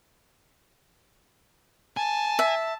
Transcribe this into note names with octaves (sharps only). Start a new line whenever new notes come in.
G#5 A5
E5